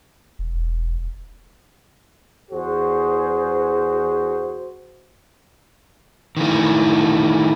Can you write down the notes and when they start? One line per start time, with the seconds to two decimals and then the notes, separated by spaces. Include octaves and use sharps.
0.39 E1
2.52 E2 F#4 G#4 C5
6.37 D#3 E3 A3